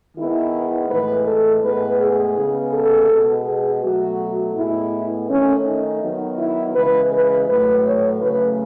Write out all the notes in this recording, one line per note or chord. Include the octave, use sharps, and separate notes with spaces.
D#3 G#3 B3 E4
A2 E3 G#3 B4
A4
A2 G#3 B3 B4
G#4
C#3 G#3 B3
A4
B2 G#3 B3
G#4
B2 F#3 A3 F#4
A2 G#3 B3 E4
D#3 A3 C#4
D#4
D#3 F#3 B3
E4
C#3 E3 G#3 B4
B4
A2 F#3 A3 B4
C#5
C#3 F#3 A3 B4